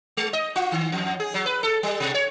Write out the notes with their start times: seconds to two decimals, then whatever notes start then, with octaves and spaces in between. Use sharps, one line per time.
0.17 G#3
0.33 D#5
0.56 F4
0.72 D#3
0.92 F2
1.20 G#4
1.34 F#3
1.46 B4
1.63 A4
1.83 G3
2.00 B2
2.14 C#5